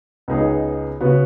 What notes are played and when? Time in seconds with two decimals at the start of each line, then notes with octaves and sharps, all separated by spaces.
0.28 C#2 C#3 B3 D#4 G#4
1.01 C#3 B3 F#4 B4